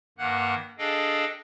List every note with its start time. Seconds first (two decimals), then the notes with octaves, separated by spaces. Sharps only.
0.18 G2 D#3 A#3 F#5 F#6
0.78 D4 G#4 A4 D#5 F5 G5